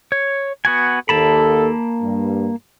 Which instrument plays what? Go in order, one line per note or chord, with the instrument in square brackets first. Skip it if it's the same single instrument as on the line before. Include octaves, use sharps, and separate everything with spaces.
[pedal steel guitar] C#5
B3 F#4 G#5
[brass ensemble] D#2 A4 [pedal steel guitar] A#3 A5 B5
[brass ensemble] G2